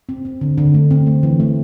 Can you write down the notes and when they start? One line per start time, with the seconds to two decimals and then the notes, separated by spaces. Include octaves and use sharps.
0.09 C4
0.25 C4
0.41 D3
0.58 D3
0.74 A3
0.91 C4
1.07 A3
1.23 E3
1.40 A3